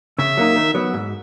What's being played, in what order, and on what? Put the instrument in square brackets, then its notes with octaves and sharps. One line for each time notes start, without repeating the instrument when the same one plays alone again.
[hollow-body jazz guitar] C#3 [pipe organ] E5
[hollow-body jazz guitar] F#3 A#3 D#4
D#3
F#3 B3
G#2